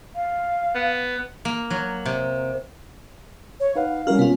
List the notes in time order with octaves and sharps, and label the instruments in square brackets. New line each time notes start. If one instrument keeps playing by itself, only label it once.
[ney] F5
[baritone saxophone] B3
[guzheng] A#3
F#3
C3
[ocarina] C#5
[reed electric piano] D#4 B4 F#5 [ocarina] F5
[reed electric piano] G3 E4 F6 [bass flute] C#4 [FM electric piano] F#4 A#4
[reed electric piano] C3 G#3 [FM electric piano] B3 F4